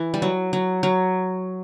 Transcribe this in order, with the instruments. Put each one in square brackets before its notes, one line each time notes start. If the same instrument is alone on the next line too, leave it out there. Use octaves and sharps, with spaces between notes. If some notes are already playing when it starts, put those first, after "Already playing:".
Already playing: [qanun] E3
G3
F#3
F#3
F#3